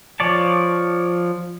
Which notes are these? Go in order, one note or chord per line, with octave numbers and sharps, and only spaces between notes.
F3 C#5 D5 A5